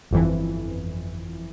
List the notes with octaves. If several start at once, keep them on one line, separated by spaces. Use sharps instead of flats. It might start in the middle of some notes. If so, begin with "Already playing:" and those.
G1 F2 E3